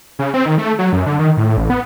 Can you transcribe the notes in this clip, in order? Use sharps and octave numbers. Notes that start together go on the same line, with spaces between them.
C#3
C4
D#3
A3
F#3
F#2
D3
D#3
A2
A1
B3